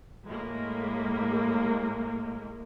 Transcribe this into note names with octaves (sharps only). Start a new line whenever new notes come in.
A2 G#3 A#3